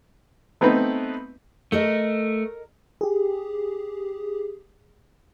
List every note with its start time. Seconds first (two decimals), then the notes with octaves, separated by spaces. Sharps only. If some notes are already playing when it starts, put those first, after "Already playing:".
0.61 A3 B3 C4 D#4 B4
1.72 A3 A4 A#4 D#5
3.01 G4 G#4